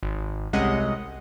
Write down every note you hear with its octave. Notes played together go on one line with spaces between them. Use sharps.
G#1
C2 C3 G#3 C#4 D#5 F#5